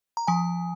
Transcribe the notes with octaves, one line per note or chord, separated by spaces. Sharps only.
A#5
F3 G#5